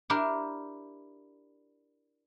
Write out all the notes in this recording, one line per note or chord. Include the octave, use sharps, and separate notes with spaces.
D4 E4 G4 A#4